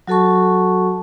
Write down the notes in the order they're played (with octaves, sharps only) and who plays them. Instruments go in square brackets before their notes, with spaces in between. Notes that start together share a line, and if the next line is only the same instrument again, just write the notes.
[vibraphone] F#3 F#4 A4 A5 C#6